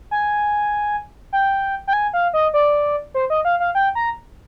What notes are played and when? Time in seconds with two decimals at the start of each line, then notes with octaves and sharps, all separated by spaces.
0.11 G#5
1.33 G5
1.87 G5
1.93 G#5
2.13 F5
2.34 D#5
2.54 D5
3.14 C5
3.30 D#5
3.45 F5
3.60 F5
3.75 G5
3.95 A#5